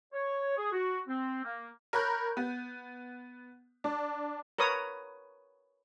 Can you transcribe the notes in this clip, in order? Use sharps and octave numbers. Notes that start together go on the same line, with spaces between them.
C#5
G#4
F#4
C4
A#3
A#4 C#5 B5 F#6 G6
B3
D4
A#4 B4 C#5 D#6